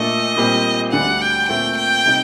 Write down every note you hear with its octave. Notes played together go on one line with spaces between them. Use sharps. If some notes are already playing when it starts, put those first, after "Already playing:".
Already playing: A#2 A3 D4 A4 D#5
A#2 G3 C4
D2 D3 G3 D4 F#5
G5
A#2 A3 C4 G5
G5
C3 G3 C4 D#4